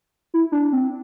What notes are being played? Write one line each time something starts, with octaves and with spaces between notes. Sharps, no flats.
E4
D4
C4